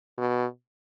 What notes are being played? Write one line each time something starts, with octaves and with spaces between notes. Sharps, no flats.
B2